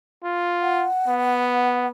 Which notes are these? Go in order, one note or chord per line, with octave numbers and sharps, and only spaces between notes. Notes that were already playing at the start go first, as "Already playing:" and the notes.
F4
F#5
B3